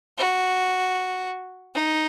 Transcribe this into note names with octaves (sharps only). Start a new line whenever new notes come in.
F#4
D#4